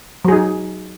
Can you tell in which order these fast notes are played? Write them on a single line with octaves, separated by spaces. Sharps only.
F#3 G#4 D#4